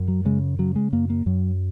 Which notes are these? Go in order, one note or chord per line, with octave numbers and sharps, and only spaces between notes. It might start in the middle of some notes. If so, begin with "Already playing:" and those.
Already playing: F#2
F#3
C#3 G#3
C#3 F#3
G#3
F#2 A#3
A#3
F#2 F#3